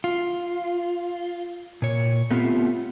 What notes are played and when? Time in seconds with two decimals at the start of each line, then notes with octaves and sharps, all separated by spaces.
0.04 F4
1.82 A#2 C#5
2.31 A3 B3 C4 F4 G4